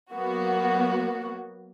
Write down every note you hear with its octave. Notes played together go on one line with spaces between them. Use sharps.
F#3 A#3 B3 F#4